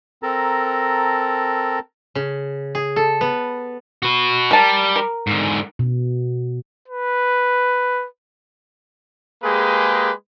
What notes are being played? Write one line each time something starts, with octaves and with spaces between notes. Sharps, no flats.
C4 A4 A#4 A5 A#5
C#3
G#4
A4
B3
F#4 B4
G3 A#4 A5
A#4
G#2 D3
B2
B4
G#3 A#3 G4 G#4 B4